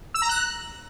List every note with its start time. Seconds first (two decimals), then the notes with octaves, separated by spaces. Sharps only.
0.14 E6
0.22 A#5
0.29 F#6